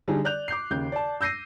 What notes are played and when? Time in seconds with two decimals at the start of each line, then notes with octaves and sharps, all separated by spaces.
0.08 D3 G3 D4 D#4 G#4
0.25 D5 F#6 G6 F7
0.48 D6 G6 C7
0.70 D#2 C#3 G6
0.92 D5 A5
1.21 E6 G6 A#6 C7 D#7